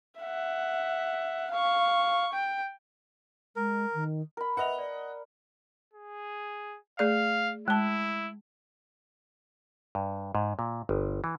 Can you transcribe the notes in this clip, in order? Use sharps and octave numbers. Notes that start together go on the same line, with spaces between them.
E5 F#5
F5 C#6
G5
G#3 A#4
D#3
A#4 B5
B4 D#5 E5 F#5 F7
D5
G#4
A3 G#4 D5 F5
G#3 E4 A5
G2
G#2
A#2
G1
E3